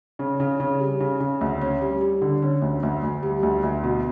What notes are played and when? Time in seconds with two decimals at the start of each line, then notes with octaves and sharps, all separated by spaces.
0.19 C#3
0.40 C#3
0.60 C#3
0.80 G3
1.00 C#3
1.20 C#3
1.41 D2
1.61 C#4
1.82 G3
2.01 G3
2.22 D3
2.42 C#4
2.62 D2
2.83 D2
3.03 D2
3.23 G3
3.43 D2
3.63 D2
3.83 B2